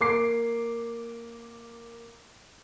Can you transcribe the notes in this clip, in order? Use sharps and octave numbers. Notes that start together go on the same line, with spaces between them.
A#3 D6 C7